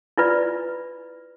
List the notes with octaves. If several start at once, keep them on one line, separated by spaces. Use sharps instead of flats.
E4 F4 B4 D5